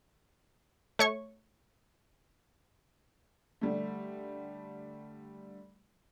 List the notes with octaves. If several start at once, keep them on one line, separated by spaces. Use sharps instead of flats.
A3 C#5 C#6
D3 G3 A3